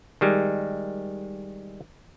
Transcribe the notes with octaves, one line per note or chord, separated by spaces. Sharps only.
D#3 G3 G#3